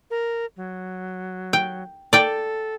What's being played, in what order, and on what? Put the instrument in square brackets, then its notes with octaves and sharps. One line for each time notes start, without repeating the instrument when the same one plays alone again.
[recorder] A#4
F#3
[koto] G5
[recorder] A4 [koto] D5 G5